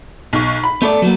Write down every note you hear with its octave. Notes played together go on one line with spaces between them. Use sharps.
B1 C#6
B5
A3 B3 A4 D5
F#3 A#3 B3